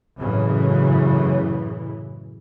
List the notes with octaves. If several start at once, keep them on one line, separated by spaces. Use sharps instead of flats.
A1 F#2 C#3 E3